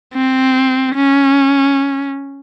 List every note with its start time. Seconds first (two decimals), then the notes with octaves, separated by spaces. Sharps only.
0.14 C4
0.95 C#4